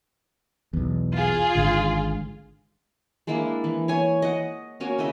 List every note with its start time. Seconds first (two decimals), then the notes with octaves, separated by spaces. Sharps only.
0.73 B1 E2
1.16 F4 G#4
1.55 G#1 G#2 D3
3.27 G#3 A#3 D4 E4
3.64 E3
3.88 C#5 G#5
4.22 D#5 F#5
4.80 A#3 C#4 F#4 G#5
4.99 C#3 E4 D#5 E5